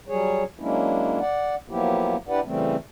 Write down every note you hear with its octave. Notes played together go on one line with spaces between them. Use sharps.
F#3 G3 G#4 C#5
F#3 G#3 A#3 C#4 D4 E4
D5 F#5
F3 F#3 A#3 B3 E4 G4
D4 E4 G4 B4 D5 F#5
C#3 E3 G3 A3 C4